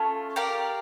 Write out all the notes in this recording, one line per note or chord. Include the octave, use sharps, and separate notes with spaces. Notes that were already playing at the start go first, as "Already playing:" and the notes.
Already playing: A3 C#4 F4
G4 A#4 D5 F5